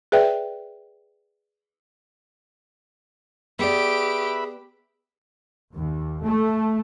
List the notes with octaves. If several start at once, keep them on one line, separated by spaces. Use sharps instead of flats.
G#4 B4 D5 E5 G5
B3 G4 G#4 B4 D5 E5 B5 D7
D#2
A3